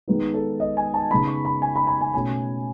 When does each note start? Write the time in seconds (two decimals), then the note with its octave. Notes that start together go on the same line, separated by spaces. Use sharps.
0.08 D#3 G#3 B3 D#4
0.34 A4
0.60 D#5
0.77 G#5
0.94 A5
1.11 C#3 G#3 B3 D#4 B5
1.27 C#6
1.45 B5
1.62 G#5
1.76 B5
1.87 B5
2.01 G#5
2.14 B2 A3 C#4 G#5